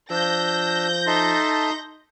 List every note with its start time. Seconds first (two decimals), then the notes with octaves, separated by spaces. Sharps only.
0.10 F3 D4 E6 G6 A#6
1.07 D#4 A4 E5 A5 C6